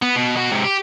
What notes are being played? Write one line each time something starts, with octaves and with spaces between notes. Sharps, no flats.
B3
B2
B2 F#4
G#2 C3
G4